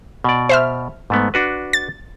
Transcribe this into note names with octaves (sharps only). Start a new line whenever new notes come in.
B2 D5
C5 E5 F6
G#2 A3 B3
D4 F#4 B4
A6